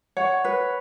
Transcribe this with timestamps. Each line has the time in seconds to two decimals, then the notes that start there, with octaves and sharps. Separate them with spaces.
0.17 C#5 F#5
0.44 B4